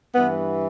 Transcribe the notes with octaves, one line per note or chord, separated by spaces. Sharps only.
G2 E3 B3